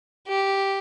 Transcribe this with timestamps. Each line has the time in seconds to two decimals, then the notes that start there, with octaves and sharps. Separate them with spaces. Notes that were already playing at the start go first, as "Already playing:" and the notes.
0.28 G4